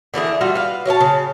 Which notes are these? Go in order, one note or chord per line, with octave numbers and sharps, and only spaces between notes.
D3 E3 E4 G#4
G3 A3 F4 F#4
B4 F5
F#3 C#5 F5 A5
C#3